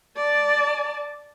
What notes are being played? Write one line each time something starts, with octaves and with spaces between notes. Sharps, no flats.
D5 A5